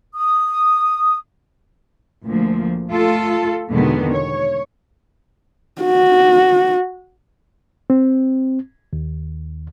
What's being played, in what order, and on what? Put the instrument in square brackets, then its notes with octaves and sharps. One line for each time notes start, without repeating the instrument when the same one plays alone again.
[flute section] D#6
[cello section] D2 A#2 F3
A3 F4 A4
E2 B2 D3 D#3 G#3 B3
C#5
[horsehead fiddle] F#4
[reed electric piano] C4
D#2